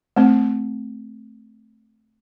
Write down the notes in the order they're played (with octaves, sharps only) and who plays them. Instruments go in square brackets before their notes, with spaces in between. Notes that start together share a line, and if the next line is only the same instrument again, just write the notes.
[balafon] A3 C4